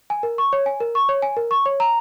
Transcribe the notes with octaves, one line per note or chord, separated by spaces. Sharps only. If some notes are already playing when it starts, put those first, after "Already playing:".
G#5
A#4
C#6
C#5
G#5
A#4
C#6
C#5
G#5
A#4
C#6
C#5
A#5